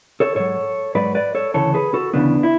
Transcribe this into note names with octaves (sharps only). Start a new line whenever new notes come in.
A4 C#5
G#2 F#3 A4 C#5
G#2 F#3 B4 D5
B4 D5
A4 C#5
D2 C#3 E3 A4 C#5
G#4 B4
F#4 A4
D2 C#3 E3 B3 D4
E4